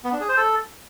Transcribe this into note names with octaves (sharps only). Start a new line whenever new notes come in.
B3
D4
G#4
C5
A4